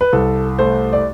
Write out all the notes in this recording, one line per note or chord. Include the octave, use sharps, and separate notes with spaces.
B4
C2 A4
A3 C5
D5